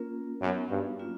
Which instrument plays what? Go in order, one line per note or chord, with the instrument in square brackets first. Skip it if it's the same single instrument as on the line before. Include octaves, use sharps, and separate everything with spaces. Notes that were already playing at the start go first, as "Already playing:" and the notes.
Already playing: [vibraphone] A#3 C#4 F4 A#4
[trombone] F#2 [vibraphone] B3 D#4 F#4
[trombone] G2
[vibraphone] F#3 A#3 C#4 F4